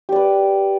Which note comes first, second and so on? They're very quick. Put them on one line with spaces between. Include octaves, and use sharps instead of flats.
G4 D5 B4